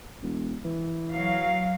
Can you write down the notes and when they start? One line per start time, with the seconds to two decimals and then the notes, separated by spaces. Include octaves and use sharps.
0.22 E1
0.65 E3
1.11 F#3 F5